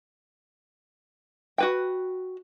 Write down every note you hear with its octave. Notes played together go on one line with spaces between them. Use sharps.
F#4 B4 G5